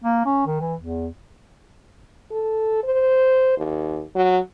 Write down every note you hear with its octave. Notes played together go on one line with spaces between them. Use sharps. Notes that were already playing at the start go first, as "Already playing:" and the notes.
A#3
C#4
D#3
E3
E2
A4
C5
D#2
F#3